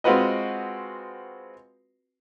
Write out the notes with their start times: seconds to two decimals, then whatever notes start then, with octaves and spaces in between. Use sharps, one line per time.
0.04 G#3 C4 F4 F#4 B4 D#5